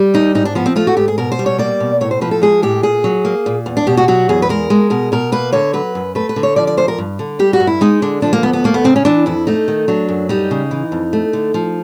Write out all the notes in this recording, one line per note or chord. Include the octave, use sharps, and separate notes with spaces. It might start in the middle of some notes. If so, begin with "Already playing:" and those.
Already playing: G3
D#2 D#4
G#2 D#4
D4
F3 B3
C4
A3 F4
F#4
G#2 G4
G#4
B2 A#4
C5
G3
C#5
A#3 D5
B2
A2 C#5
C5
F3 B4
A4
G#3 G#4
A2 G4
A#2 G#4
F#3
A#3
A#2
E2
D4
B2 G4
F#4
F#3 F#4
E2 G#4
B4
G#3 A#4
G#3
B2 A#4
B2 A#4
A#3 B4
D3 C#5
F#3 B4
F#2
A3 B4
B4
D3
C#5
F3 D5
D5
D2 C5
A#4
G2
D3
G3 G4
F#4
G2
E4
G#3 D#4
D3 D4
F3 D4
A#3
D2 B3
B3
A3 A#3
B3
C#3 C4
C#4
E3 D4
F2 E4
A3 D#4
D#3
F#3 D4
F#2
G3 D#4
C#3
E3
F2
A3
D3
F3